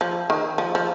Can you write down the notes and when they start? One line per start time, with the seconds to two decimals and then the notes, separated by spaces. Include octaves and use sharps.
0.01 F3
0.30 D#3
0.58 F3
0.75 F3